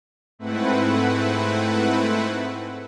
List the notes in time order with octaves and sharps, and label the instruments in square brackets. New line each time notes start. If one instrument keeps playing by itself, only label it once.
[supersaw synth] G#2 A3 C4 E4 B4 F#5